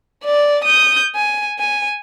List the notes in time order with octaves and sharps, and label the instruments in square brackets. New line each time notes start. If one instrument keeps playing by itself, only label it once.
[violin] D5
D#6 G6
G#5
G#5